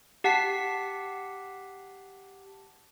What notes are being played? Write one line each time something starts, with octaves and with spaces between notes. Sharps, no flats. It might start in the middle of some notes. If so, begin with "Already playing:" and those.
G4 F#5 A5 B6 C7